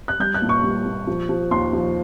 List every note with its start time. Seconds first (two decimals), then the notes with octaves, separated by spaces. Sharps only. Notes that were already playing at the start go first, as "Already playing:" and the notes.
0.08 F#6
0.20 G3 G6
0.34 F#6
0.42 A#2
0.49 C#6
0.64 G3
0.86 A#2
1.07 F3
1.29 F3
1.51 D#2 C6
1.73 F3